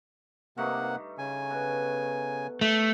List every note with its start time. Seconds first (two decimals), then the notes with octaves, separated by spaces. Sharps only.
0.57 G2 C3 A3 A#3 D#4 F#5
1.18 C#3 G#5
1.50 B2
2.61 A3